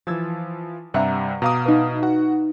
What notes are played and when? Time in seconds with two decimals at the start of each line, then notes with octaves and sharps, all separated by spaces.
0.07 E3 F3 E6 G#6 A6
0.94 G2 C3 G3 E5 F#5 A#5
1.42 B2 F5 A#5 D6 D#6
1.65 D#4 B4
2.02 F#4 F#5